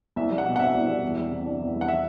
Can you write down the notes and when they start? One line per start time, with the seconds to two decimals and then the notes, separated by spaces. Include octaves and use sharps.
0.16 C2 E5
0.31 G3
0.38 F#5
0.45 B2
0.56 F#5
0.59 C4 E5
0.74 C2
0.88 G3
1.03 E2
1.17 G3
1.31 C3
1.46 D4
1.60 E2
1.74 G3
1.81 F#5
1.88 E5